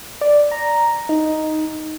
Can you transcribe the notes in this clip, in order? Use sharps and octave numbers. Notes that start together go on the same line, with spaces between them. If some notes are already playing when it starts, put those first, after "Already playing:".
D5
A#5
D#4